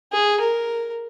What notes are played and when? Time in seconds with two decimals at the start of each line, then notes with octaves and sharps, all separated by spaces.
0.12 G#4
0.41 A#4